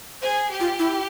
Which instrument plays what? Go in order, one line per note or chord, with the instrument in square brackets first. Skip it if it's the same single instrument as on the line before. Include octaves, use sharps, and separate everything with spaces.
[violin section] G#4 [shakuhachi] C5
[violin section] G4
[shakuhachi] F4
E4